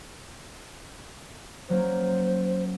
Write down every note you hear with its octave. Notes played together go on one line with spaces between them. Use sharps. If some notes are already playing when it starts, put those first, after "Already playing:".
F#3 A#3 C#4 C5